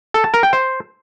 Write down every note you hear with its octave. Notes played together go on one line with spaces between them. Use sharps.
A4
A5
A#4
G5
C5